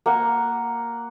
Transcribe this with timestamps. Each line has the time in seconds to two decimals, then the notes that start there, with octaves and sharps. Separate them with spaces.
0.06 A#3 F#5